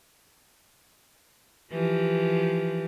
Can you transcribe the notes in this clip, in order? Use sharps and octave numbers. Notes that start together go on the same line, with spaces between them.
E3 F3 G4